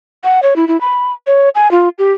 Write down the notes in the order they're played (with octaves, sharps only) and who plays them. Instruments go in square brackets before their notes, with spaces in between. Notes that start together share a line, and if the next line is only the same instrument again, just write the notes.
[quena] F#5
C#5
E4
E4
B5
C#5
G#5
F4
G4